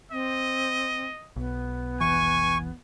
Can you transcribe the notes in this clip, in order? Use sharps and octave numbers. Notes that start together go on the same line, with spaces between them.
C4 D#5
B1 B3
F1 B1 E3 G#5 C#6